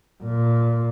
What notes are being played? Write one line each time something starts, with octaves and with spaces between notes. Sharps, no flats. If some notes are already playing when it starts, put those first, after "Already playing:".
A#2